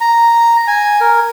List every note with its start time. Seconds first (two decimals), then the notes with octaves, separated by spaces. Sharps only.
0.01 A#5
0.67 G#5
1.01 A#4